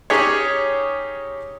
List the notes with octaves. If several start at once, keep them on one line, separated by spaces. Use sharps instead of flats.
C#4 D#4 G4 G#4 C#5